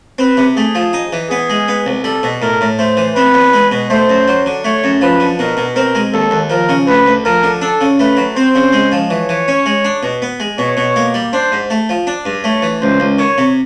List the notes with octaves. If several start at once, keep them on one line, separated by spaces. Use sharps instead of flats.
C4 B4
C3
A3 G#4
F3
D#4
E3
B3 G#4
G#3
B3
C2
G3 A4
B2
A2 A#4
A2
A3 C5
E3
C4 B4
E2
G#3
B2
A3 C5
F#2
F#3
D3
A3 C#5
F#2
F3 B4
D3
B2 A#4
B2
C4 A#4
G#3
D#2 A4
D#2
F3 A#4
C#3
D2 B4
D2
F3 A#4
D3
D4 A4
C#3
A3 B4
F#3
C4 C5
C#3
G#3
F3
E3 C#5
E3
C#4
G#3
D4
B2
B3
G#3
B2 C#5
B2
A#3
G3
D4 C5
G#2
A3
F3
D4
G2
A3 C#5
E3
C#2 C5
C#2
D#3 C#5
C3